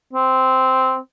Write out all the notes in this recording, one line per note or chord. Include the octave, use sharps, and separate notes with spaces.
C4